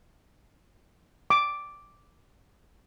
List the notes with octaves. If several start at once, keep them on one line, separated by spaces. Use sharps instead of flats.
D6